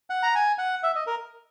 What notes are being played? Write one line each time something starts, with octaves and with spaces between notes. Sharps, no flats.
F#5
A#5
G#5
F#5
E5
D#5
A#4